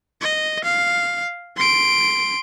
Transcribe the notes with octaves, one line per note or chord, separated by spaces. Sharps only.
D#5
F5
C6 D7